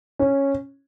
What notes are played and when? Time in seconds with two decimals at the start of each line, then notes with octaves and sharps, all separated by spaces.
0.19 C#4